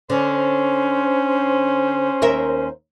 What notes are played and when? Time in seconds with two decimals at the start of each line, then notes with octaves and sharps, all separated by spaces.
0.10 D3 C#4 C5
2.22 D#2 A#4 E5